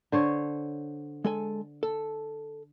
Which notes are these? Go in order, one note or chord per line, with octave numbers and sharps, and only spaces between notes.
D3 C5 C#5
G#3 A4 G#5
A4